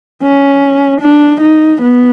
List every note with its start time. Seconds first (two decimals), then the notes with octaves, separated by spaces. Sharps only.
0.22 C#4
1.01 D4
1.41 D#4
1.82 B3